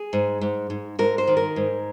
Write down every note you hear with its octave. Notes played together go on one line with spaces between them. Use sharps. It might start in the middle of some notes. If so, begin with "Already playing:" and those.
Already playing: G#4
G#2
G#2
G#2
G#2 A#4
C5
D#3
A#4
G#2